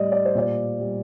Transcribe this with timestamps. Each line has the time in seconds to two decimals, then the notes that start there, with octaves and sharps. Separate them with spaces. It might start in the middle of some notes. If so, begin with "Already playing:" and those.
Already playing: A2 G3 D5 D#5
0.12 D5
0.25 C5
0.35 A#2 D5
0.80 G3